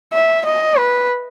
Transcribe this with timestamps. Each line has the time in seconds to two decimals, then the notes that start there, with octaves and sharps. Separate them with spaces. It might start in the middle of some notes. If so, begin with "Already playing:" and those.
0.13 E5
0.45 D#5
0.78 B4